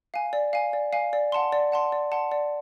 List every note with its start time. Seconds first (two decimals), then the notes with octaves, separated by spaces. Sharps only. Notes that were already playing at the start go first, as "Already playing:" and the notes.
0.14 F5 G#5
0.33 D5
0.53 F5 G#5
0.73 D5
0.93 F5 G#5
1.13 D5
1.32 F#5 A5 C6
1.52 D5
1.72 F#5 A5 C6
1.92 D5
2.12 F#5 A5 C6
2.31 D5